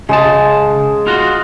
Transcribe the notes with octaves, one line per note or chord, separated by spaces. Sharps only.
C#3 G#3 G#4 A5
F4 F#4